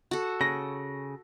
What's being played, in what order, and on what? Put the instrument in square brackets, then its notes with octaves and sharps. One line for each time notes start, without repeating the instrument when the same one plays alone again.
[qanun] F#4 A4
[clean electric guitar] C#3 [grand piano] A#6